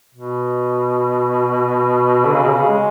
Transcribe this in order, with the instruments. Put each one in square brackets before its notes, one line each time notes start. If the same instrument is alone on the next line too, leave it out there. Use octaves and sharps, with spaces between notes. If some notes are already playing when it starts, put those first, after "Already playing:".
[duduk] B2
D3
C#3
B2
C#3
G#3